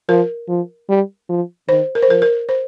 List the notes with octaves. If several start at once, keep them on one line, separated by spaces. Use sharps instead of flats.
F3 A#4
F3
G3
F3
D#3 C5
A#4
C5
F3 A#4
A#4
C5